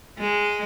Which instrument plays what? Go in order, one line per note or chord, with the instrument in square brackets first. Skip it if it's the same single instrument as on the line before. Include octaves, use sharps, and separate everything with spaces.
[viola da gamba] G#3